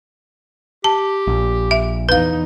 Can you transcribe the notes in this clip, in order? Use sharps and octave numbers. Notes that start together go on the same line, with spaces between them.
G4 A5
A#1
E5
E2 D#4 B4 F5